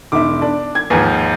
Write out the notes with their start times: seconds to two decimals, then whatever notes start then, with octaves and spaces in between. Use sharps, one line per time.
0.12 E1 D#4 E5 D6
0.42 D4
0.75 G#6
0.90 D#2 G#2 F3 B4 G#5